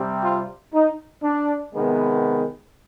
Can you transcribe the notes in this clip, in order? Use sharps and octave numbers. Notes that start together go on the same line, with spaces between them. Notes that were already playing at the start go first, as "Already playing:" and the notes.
Already playing: C3 G3 C4
F4
D#4
D4
C3 D#3 G#3 B3